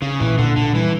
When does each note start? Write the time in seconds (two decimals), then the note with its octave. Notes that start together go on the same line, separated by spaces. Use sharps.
0.02 C#3 C#4
0.20 A#2 E3
0.38 A#2 D3
0.56 A#2 D3
0.74 E3 G3